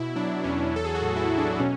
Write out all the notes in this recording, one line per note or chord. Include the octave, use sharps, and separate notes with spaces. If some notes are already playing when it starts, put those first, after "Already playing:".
Already playing: B2 E4
F#3 D4
E2 C#4
F#3 A4
G#4
F#4
A2
E4
F#3
D4
B2 C#4